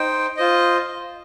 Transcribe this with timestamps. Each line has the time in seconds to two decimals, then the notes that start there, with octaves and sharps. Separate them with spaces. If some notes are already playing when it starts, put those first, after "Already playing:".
Already playing: D#4 C5 G5
0.37 F4 C5 D#5